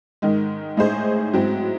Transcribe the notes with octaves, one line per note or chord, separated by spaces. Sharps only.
G#2 D#3 G#3
A2 G#3 D#4 G#4 C5
G#2 F#3 C4 E4